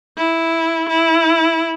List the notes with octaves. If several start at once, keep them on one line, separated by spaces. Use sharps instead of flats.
E4
E4